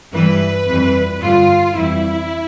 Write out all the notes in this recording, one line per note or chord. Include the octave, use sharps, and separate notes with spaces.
G2 E3 G3 B4
F2 E3 G3
G2 D3 G3 F4
F2 E3 G3 E4